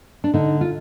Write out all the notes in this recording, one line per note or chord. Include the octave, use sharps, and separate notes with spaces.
D4
D3 D#4
F4